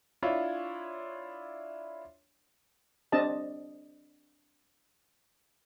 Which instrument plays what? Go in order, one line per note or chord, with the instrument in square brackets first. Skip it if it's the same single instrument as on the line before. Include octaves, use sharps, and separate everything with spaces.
[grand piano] D4 E4 F4 C#5
[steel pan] C4 D4 G4 D#5 A5